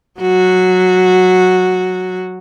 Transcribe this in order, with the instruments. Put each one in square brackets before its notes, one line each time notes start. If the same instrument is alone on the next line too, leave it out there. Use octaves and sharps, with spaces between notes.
[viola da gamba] F#3 F#4